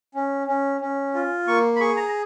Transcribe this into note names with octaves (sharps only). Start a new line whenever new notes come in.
C#4
C#4
C#4
F4
A#3 C#6
B5
G#4 C#6
A#5